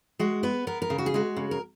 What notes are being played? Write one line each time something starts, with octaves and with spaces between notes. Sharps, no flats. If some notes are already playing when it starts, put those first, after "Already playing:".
G#3 F#4
B3 B4
B3 A#4
A#4
C#3
F#4
G#4
G#3 F#4
C#3
A#4